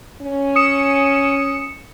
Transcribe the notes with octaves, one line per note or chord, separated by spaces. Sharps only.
C#4
D#6 C#7 E7